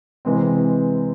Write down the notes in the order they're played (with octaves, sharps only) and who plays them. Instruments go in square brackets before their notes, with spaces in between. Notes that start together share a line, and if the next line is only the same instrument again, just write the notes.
[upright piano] C3 E3 G#3 C4